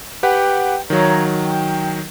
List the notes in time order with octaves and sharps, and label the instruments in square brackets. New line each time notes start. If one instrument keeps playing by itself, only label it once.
[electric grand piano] G4 B4 F#5 [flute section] G5
[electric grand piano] D#3 F#3 [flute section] C#5 F5 A#5
[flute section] G5